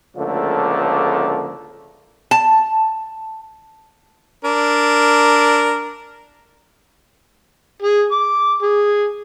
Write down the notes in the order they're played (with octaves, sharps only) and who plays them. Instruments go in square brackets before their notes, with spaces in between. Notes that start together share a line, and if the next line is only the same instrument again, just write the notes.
[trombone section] C#2 A2 D3 F3 A3 A#3
[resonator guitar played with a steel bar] A5
[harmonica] D4 A#4
G#4
D6
G#4